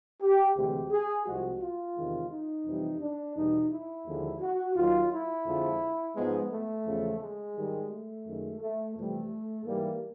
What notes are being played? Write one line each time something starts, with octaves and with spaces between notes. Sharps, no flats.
G4
D2 C3 E3 G#3 G4
G#4
C2 C3 F3 G#3 F#4
F4
E2 C3 D#3 G#3
D#4
F2 C3 E3 G3
D4
E2 B2 G3 D#4
E4
D#2 D3 F3 G#3
F#4
D#2 D#3 F#3 F4
E4
F2 D3 F3 G#3
G#2 F3 G#3 B3
A3
E2 C#3 F3 G#3
G#3
G#2 D#3 G3
A3
F#2 D#3 G#3
A3
F2 C3 E3 G3 A3
G#2 E3 G3 A#3